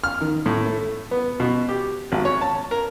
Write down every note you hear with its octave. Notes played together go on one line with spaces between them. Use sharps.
F6
D#3
A2
A3
B3
B2
G4
G#1
C#5
A5
A#4